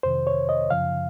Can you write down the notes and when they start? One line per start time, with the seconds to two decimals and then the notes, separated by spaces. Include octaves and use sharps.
0.03 F2 C3 D#3 C5
0.27 C#5
0.49 D#5
0.70 F#2 C#3 F3 F5